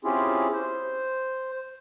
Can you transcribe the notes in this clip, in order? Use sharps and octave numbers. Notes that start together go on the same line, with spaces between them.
C4 C#4 E4 F4 G4 G#4
C5